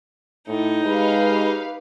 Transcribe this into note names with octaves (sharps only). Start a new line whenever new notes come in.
A2 D#4
G#3 G4 B4 F5